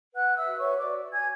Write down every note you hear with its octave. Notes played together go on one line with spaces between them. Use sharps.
B4 F#5 F#6
E5 E6
F#4
C#5 C#6
F#4 D5 D6
F#4 G#5 G#6